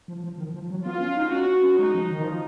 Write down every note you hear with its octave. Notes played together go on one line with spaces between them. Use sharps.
F3
F3
D#3
F3
F#3
B3 F4
C#4
D#4
C#4 F#4
C#4
G#3 D#4
F3
D#3
F3